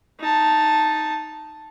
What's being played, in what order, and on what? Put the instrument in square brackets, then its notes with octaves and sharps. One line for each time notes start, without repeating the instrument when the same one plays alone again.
[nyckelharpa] D#4 A5